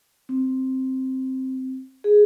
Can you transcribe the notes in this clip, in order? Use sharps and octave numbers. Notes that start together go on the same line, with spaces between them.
C4
G#4